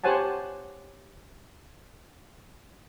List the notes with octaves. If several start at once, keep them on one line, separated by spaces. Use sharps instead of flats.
G4 C5 C#5 F#5 G#5 A5